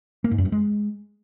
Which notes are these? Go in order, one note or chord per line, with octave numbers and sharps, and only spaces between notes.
A#3
G#2
F#2
G2
G#3